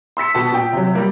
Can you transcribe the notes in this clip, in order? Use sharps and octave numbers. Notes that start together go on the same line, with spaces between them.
C6 E6 B6 C#7
B2 B3 A5
A#2 G5
C3 F#3
G3 A#3